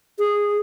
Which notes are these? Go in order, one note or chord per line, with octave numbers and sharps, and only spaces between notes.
G#4